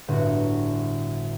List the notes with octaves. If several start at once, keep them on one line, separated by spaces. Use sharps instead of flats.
G1 A2 F#4